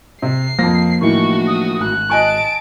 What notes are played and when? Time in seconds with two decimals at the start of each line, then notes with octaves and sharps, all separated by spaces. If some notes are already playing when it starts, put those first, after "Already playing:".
0.22 C3 C7
0.59 F2 F3 A#3 A#6
1.01 A2 D#3 E3 D4 F#4 C#6
1.47 D#6
1.81 G#1 F#6
2.10 D#5 G#5 A5 C#6 D7